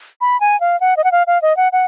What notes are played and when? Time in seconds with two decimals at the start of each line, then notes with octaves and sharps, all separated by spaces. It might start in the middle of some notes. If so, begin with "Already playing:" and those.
0.21 B5
0.41 G#5
0.60 F5
0.81 F#5
0.97 D#5
1.04 F#5
1.12 F5
1.27 F5
1.42 D#5
1.57 F#5
1.72 F#5